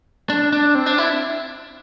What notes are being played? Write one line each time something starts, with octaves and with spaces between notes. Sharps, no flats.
D4
D4
C4
D4
E4